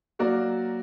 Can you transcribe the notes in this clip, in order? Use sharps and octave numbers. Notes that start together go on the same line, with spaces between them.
F#3 A#3 F#4 A#4 D5